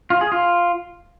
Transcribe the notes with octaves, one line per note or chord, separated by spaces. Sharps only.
F4
G#4
F4